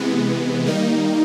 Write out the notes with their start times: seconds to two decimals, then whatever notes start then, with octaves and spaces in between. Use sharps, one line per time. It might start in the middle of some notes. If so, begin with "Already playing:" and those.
Already playing: C3 E3 G#3 B3
0.66 D#3 G3 A#3 D#4